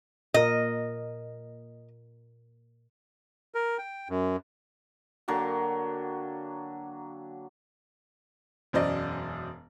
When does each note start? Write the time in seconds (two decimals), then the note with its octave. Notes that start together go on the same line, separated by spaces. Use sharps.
0.34 A#2 A#4 D#5
3.55 A#4
3.78 G5
4.09 F#2
5.28 D3 F#3 A#3 G5
8.73 E1 F#2 C5 D5 D#5